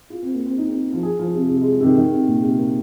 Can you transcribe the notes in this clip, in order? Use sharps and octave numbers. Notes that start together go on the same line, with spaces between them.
F4
C4
A#3
C4
D#4
C4
F3
G#4
F3
C3
C3
G#3
C3
D#3
D#3
C3
A#2
C3
A#3